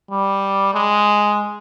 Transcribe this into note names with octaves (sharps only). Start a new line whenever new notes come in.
G3
G#3